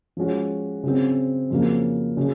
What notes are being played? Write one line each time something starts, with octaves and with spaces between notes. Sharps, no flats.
F3 G#3 C#4 F#4
C#3 F#3 C4
F2 C#3 F#3 A#3
C#3 F#3